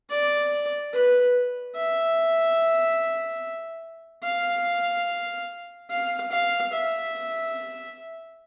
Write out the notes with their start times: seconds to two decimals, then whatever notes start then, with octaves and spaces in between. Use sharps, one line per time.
0.10 D5
0.93 B4
1.76 E5
4.24 F5
5.90 F5
6.31 F5
6.73 E5